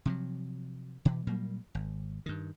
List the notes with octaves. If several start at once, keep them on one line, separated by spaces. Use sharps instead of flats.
C3 F3 F#3
B2 E3
A#2 F#3 G3 A#3
G#1
G2 D#3